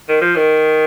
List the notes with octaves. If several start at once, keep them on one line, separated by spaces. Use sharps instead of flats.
D#3
F3
D#3